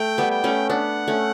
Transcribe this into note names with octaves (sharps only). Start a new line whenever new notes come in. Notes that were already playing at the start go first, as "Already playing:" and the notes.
Already playing: A3 G5
G3 B3
G5
A3 C#4
B3 D4 F#5
A3 C#4